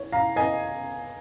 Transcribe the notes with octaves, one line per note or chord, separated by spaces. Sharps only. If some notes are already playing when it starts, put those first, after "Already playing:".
Already playing: C#5
F5 A#5
D#5 G#5